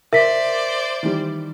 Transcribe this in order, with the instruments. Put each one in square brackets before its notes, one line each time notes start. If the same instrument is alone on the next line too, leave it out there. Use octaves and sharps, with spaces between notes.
[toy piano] A#4 [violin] C5 D5 [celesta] E5 B6
[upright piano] D#3 E3 G3